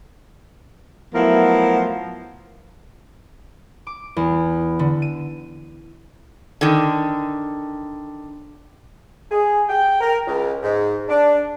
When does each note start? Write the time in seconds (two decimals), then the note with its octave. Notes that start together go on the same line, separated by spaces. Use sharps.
1.14 F3 F#3 A3 B3 E4 A#4
3.87 D6
4.16 E2
4.79 D3
5.02 D#7
6.61 D3 D#3
9.31 G#4
9.69 G5
10.01 A#4
10.28 C#2
10.63 G#2
11.09 D4